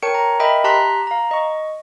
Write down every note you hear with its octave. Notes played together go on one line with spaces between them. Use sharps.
A#4 C#5 G5 A5 C#6 C#7
A#5
A#4 D#5 E5 G5 B5
G4 A5 A#5 C6 F#6 B6
F5 A#5
D#5 C#6